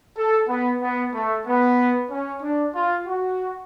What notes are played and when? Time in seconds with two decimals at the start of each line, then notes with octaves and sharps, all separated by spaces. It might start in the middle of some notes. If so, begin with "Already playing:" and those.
0.18 A4
0.49 B3
0.82 B3
1.14 A3
1.47 B3
2.11 C#4
2.42 D4
2.75 F4
3.06 F#4